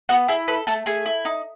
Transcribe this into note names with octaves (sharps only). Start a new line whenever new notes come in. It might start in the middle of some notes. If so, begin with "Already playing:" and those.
B3 F#4 F#5
E4 G#4 G#5
A4 B4 B5
A3 A4 A5
A3 G#4 G#5
E4
D#4